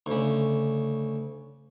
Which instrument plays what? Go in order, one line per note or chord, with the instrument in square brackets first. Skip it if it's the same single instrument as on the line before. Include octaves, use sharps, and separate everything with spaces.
[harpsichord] D2 C#3